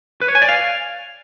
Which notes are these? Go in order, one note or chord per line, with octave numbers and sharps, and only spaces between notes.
B4
C#5
G#5
D5
F5